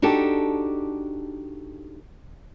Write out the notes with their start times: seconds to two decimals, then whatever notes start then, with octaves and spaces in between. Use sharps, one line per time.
0.02 D4 D#4 F#4 G4 A4